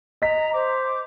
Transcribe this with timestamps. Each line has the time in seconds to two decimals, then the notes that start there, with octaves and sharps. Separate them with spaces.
0.22 D#5 A#5 B6
0.53 C5 D6